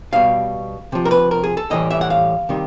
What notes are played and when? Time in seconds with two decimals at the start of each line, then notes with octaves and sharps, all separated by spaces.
0.13 B2 G3 F5
0.92 C3 F3
1.05 A#4
1.11 B4
1.31 A#4
1.44 G#4
1.57 A4
1.70 A2 E3 G3 D#5
1.91 E5
2.01 F#5
2.10 F5
2.49 C3 D#3 G3